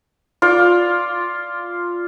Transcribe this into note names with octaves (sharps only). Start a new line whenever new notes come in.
F4 D5